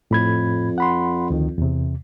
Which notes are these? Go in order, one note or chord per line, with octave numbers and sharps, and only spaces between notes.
F2 A2 B5 G#6
F#5 B5 C6
D2 D#3
E2 C3